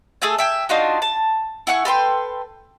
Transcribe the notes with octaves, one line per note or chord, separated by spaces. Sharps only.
A3 G#4 A4 G#5
E5 G5 G#5
D4 D#4 F4 F#4
A5
E4 F#5 G#5 C#6
A4 B4 G5 C6